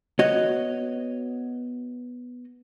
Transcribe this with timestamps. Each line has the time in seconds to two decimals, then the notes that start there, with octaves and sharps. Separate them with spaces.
0.19 B3 F#4 C#5 D#5